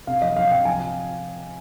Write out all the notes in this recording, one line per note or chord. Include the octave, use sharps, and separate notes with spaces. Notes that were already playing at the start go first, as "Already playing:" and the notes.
C3 F5
F3 D#5
F3 F5
C3 G5
F3 G#5